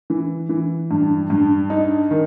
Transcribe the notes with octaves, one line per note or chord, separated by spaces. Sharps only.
E3
E3
G2
G2
D#4
D#3